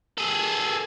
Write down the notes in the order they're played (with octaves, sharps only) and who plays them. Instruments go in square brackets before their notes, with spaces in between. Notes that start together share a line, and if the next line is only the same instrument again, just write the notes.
[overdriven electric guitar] G#4 A4